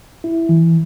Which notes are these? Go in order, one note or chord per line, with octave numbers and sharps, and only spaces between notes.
E4
E3